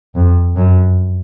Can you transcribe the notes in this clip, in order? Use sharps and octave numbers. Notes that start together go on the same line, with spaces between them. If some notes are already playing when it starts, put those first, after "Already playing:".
F2
F#2